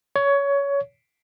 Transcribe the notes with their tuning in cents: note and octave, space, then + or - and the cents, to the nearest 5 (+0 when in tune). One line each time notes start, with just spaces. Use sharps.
C#5 +20